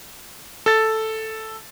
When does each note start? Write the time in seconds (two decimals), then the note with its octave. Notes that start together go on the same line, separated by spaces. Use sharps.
0.66 A4 A6